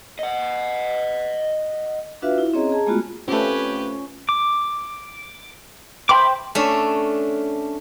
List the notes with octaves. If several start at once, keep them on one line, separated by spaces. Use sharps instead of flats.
D#5 F#5
D4 F4 F#4 B4 E5 F5
E4
C4 C#4 G#4 C#5 D#5 A#5
G#4 A5 A#5
G#3 A3 B3 F4 F#4
A3 C4 C#4 F4 G4 B4
D6
C5 E5 G5 B5 D6
A3 C#4 D4